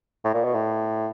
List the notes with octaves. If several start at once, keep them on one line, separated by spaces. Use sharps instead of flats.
A2
A#2
B2
A2